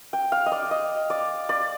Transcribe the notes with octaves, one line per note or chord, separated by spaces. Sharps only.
G5
F5
D#5
D5
D#5
D5
D5